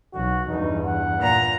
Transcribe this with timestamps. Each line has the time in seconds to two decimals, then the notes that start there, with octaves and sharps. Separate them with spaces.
0.14 B1 F#4
0.48 E2 G2 D#4
0.84 F#5
1.21 A#2 A#5